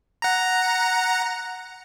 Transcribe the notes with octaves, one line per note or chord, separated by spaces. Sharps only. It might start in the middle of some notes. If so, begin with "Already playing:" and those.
F#5 A#5